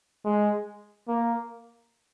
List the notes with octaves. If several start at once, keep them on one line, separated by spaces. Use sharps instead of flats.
G#3
A#3